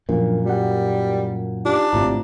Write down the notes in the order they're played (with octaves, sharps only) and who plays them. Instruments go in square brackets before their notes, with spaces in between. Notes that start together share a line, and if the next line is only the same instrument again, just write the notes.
[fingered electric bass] F#2 A#2 [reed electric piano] F3 D4 A#4
[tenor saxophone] G3 [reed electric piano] F#4 F#5
[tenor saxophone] D4 [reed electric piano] D#4 F4 G4
[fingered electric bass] G#1 A2 C3 [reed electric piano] F4 A#5